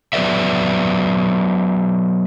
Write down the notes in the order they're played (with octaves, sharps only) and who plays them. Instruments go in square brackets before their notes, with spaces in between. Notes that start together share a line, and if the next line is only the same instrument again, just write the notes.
[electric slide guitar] F#3 B3 C#4 B4 D5 E5